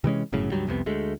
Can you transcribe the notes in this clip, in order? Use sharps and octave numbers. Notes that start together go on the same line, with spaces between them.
C3 E3 G#3 C#4
G1 F#2 A2 C#3
C#2 G2 F#3 G3
C2 F2 C3 B3
D2 G#3 A3